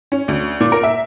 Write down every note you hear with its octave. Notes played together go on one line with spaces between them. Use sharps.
C#4
D2
A#2
A#4
E5